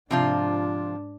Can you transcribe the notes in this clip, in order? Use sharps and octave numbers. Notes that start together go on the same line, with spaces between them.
G#2 C3 F3 D4 F4